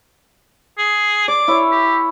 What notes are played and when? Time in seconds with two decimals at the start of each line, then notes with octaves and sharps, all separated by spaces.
0.78 G#4
1.28 D5 D6
1.48 E4 C#5 E5
1.72 G4